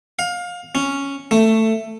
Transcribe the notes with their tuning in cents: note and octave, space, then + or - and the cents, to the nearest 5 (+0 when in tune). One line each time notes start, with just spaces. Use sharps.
F5 +25
C#4 +0
A3 +10